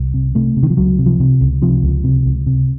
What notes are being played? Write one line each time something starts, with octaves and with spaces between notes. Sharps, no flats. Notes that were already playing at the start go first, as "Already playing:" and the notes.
Already playing: C2
C3
C3 A3
C3
D#3
F3
C#2 F#3
C3
F3
C3
C#2
C3 F3
C#2
C3
C#2
C3